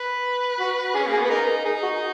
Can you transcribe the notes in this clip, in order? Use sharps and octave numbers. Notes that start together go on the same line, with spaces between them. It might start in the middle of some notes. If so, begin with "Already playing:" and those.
Already playing: B4
F#4
C#4 G#4
A#3
G#4
B3
B4
D#4 A#4
D#4 G#4
F#4